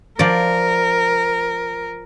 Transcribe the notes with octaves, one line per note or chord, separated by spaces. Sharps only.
F3 A#4 D5